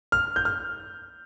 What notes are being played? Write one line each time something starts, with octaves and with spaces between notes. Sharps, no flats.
F6
G6
F6